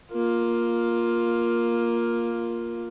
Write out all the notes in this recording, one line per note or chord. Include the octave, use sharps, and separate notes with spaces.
A#3 F4